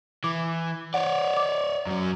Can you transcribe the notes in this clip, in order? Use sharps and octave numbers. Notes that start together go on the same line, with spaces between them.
E3 D6
C#5 D5 F#5
D6
F#2 F#3